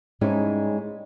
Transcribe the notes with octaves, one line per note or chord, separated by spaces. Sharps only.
G#2 G3 G#3 C#4 D#4 E4